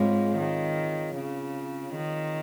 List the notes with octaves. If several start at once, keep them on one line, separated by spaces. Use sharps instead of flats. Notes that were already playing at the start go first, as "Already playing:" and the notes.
Already playing: G#2 G#3 C4 F4 G#4 C#5 F5
D#3
C#3
D#3